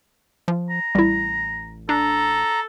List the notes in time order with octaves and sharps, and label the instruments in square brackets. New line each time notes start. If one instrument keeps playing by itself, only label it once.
[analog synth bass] F3
[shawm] A#5
[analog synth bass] A1 [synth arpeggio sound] G3 E4
[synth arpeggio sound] D4 [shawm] A4 [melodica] A#5